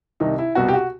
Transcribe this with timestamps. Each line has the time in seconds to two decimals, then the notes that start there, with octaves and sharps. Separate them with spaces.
0.20 C2 C3 D#3 D#4
0.39 E4
0.55 C2 B2 F#4
0.68 G4
0.74 F#4